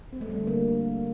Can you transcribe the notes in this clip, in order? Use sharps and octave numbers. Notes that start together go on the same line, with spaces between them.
C4
A3
G3
D3
A#3